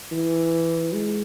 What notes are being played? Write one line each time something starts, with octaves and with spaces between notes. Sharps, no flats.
E3
G#3